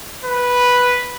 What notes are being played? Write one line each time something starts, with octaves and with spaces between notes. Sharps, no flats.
B4